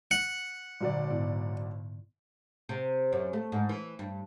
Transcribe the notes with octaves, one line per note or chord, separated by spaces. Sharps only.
F#5
G#1 A#2 D3 F#3 D5
G#2 B3 E4
C3
F#2
A3
G#2
E3
G2